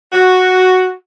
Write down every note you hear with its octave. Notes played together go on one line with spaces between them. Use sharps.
F#4